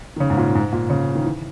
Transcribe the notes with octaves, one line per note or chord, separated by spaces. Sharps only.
D#3
C#3
G#2
A#2
G#2
A#2
C#3
D#3
E3